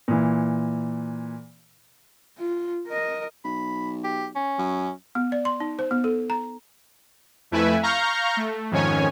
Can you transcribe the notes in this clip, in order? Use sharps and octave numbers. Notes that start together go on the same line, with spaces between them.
A#2 E3
F4
A#4 D#5
B1 B5
G4
C#4
F#2
B3
D5
C6
D#4
C5
B3
A4
A#5
F2 A3 E4 B4 E5 G#5
F5 A#5 C#6 F6 G6 A#6
A3
F2 G#2 D#3 C#4 C#5 G#5